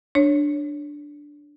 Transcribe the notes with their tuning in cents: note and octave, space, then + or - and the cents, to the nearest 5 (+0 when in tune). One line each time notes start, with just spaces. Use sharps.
D4 +0 C#5 +0